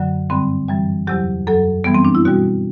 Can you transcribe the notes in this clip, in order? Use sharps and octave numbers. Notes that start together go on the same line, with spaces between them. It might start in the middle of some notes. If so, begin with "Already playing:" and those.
Already playing: F#2 D3 F#3
G2 D3 G3 C4
F#2 E3 G3
E2 C3 F#3 G4
F#2 F#3 A4
G2 E3 G3 B3
C4
D4
E4
B2 G3 F#4